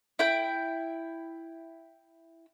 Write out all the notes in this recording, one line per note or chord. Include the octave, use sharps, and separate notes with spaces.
E4 G5